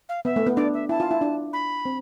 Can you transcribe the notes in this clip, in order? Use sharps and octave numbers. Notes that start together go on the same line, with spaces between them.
F5
B3 E5
A3
B3
D4 D5
E5
E4 A5
F4
E4
D4
B5
C4